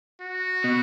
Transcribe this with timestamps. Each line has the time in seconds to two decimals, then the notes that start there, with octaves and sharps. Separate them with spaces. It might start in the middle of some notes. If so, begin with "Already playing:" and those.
0.21 F#4
0.64 B2